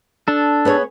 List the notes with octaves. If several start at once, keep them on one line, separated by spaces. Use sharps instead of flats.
D4 A4
B3 G#4 C#5